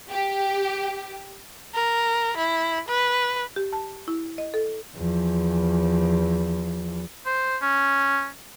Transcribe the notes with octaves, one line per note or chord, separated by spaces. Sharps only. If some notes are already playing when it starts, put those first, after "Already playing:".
G4
A#4
E4
B4
G4
A5
E4
D#5
A4
E2 F3
C5
C#4